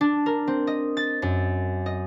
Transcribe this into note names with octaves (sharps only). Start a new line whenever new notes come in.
D4
A#4
C4
D#5
A6
F#2
D#5